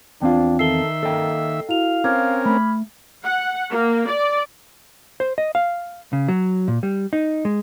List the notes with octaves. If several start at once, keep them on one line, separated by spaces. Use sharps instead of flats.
E2 C4 D4 F4 F5 G5
D#3 A4 E5 C7 G7
A#3 A4 D#5 G5
E4 F#4 F5 F7
C4 C#4 A#4 D6 F6 G#6
A3 B5
F#5
A#3
D5
C5
D#5
F5
C#3
F#3
A#2
G3
D#4
G#3